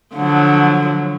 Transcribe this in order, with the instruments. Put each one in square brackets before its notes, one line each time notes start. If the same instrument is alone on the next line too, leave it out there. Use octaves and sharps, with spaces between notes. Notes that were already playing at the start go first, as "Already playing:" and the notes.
[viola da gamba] D3 F3 F#3